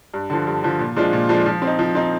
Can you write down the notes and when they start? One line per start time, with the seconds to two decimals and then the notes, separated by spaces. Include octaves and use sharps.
0.14 G2
0.30 D3 F3
0.47 G2
0.63 D3 F3
0.79 A#2
0.96 F3 G#3 D4 F4
1.13 A#2
1.29 F3 G#3 D4 F4
1.46 F3
1.62 C4
1.67 D#4
1.79 F3
1.95 C4 D#4